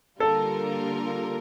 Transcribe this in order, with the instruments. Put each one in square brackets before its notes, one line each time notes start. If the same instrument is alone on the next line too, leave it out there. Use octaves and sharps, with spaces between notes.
[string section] D3 G3 A#3 F4 A#4 [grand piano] A4